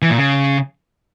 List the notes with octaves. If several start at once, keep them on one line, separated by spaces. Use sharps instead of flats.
E3
A#2
C#3